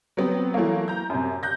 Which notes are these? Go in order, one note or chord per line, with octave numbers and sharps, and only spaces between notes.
F#3 B3 C4
E3 F#3 A3 A#3
A#5 G6
F#2 C3
F#6 G6 A#6